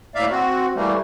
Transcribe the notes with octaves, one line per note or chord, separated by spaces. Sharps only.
A2 A#3 D5 E5 F5
C4 F#4
E3 G3 A3 A#3